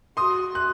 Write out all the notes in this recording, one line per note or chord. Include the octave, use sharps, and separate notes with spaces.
F#4 C6 D#6
F#6